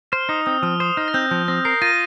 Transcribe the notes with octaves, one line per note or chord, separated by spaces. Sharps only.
C5 F6
D#4 D#6
C4 D#6
F3 F6
C5 D#6
D#4 F6
A#6
C4 G6
F3 G6
C4 A#6
A#4 C7
F4 A#6 D#7